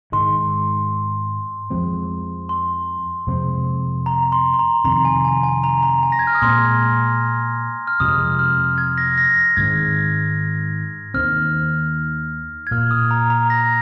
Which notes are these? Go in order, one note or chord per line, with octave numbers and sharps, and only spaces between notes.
G#2 D#3 G#3 C6
F2 F3 G#3 C4
C6
F2 C3 G#3 C4
A#5
C6
C6
A#5
F2 C3 D#3 A#5
G#5
G#5
G#5
A#5
A#5
G#5
A#6
G#6
F6
D#6
A#2 G#3 C4 C6
F6
F2 C3 F3 G#3 D#6
F6
G#6
A#6
A#6
A#6
G#2 D#3 G#3 C4 G#6
D#2 D#3 C4 F6
G#6
A#2 A#3 F6
D#6
A#5
A#5
A#6